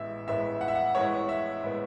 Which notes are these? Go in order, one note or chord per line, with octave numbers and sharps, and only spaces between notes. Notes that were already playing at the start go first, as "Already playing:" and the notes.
Already playing: A1 A2 G#3 B3 E5
A1 A2 G#3 B3 E5
F#5
E5
F#5
A1 A2 G#3 B3 C#5
E5
A2 G#3 B3